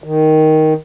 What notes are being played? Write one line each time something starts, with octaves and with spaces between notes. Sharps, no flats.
D#3